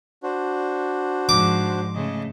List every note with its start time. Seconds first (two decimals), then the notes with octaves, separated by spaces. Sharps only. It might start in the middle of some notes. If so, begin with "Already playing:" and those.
0.23 D4 F#4 C5
1.29 G#2 F3 D6
1.95 C#3 A3 D#5